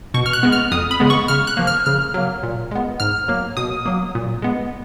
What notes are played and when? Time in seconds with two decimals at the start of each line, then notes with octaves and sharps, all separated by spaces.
0.14 B2 C#6
0.26 F6
0.33 F#6
0.43 G#3 B3
0.52 F6
0.72 F2 D#6
0.91 B5
1.00 C#3 G#3 B3
1.10 C#6
1.28 C#3 F6
1.47 F#6
1.57 F3 A#3
1.67 F6
1.86 C#3 F6
2.14 F#3 A#3
2.43 A#2
2.71 G#3 B3
3.00 G#2 F6
3.28 F#3 A#3
3.57 B2 D#6
3.85 F#3 A#3
4.15 A#2
4.42 G#3 B3